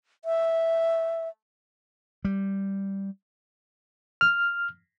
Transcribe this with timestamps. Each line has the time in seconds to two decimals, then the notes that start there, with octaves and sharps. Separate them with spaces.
0.25 E5
2.25 G3
4.21 F6